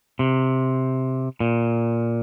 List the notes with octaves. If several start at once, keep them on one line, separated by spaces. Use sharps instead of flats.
C3
A#2